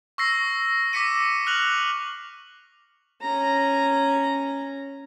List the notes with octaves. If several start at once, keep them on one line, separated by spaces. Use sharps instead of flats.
C#6 E6 A#6 C7
D6 A#6 B6 C#7 D#7
F6 F#6 F7 F#7
C#4 A#5